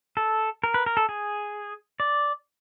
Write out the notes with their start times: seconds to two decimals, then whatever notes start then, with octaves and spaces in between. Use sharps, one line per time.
0.17 A4
0.64 A#4
0.74 B4
0.86 A#4
0.97 A4
1.09 G#4
2.00 D5